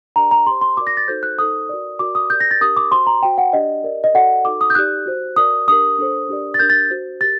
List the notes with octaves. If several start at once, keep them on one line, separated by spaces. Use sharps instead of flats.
D4 G4 A#4 D5 A#5
A#5
G4 C5 C6
C6
F#4 A#4 D5 D6
A#6
A6
D#4 F#4 A4 C5 G6
F#6
D#4 A4 C5 D#6
F#4 A#4 D5
F#4 A#4 D5 D6
D#6
G4 A#4 D5 G6
A#6
A6
D4 G4 A#4 D#6
D6
F#4 C5 C6
A#5
F#4 C5 G5
F#5
D4 G4 D5 D#5
G4 A#4 D5
D#5
F#4 A4 D5 F#5
D#4 F#4 A4 D6
D#6
G6
D#4 G4 D5 F#6
F#4 C5
F#4 A#4 D5 D#6
D4 G4 A#4 D#6
D4 A4 C5
D4 G4 A#4 D5
A6
D4 G4 A#4 G6
A6
F#4 C5
G4 A#4 A6